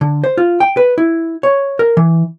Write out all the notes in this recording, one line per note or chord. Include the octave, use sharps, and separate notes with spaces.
D3
C5
F4
G5
B4
E4
C#5
A#4
E3